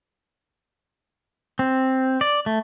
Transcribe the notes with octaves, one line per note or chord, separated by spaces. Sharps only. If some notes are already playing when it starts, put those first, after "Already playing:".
C4
D5
A3